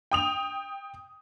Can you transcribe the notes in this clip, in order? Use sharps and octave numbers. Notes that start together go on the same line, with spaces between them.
G5 D#6 F7